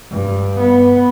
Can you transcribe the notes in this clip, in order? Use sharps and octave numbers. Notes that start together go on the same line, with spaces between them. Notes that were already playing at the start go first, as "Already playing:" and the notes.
G2
B3